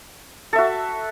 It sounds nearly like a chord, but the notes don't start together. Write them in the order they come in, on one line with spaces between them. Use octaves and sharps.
A4 E5 F#4